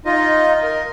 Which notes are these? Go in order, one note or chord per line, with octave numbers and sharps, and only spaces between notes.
D#4 F4 D#5
A#4